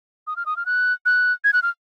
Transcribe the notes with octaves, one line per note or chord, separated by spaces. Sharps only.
D#6
F6
D#6
F6
F#6
F#6
G#6
F#6
F6